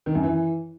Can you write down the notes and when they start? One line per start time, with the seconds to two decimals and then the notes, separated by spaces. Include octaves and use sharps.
0.06 D#3
0.15 F#2
0.23 E3